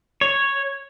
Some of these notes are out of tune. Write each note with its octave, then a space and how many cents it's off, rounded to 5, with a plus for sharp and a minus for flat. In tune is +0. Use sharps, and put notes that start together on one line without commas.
C#5 -5